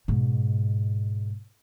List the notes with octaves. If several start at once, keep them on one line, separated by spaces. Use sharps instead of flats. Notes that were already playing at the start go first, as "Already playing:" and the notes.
G#2 B2